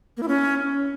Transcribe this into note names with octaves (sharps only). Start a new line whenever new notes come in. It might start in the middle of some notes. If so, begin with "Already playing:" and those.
A#3
E4
C#4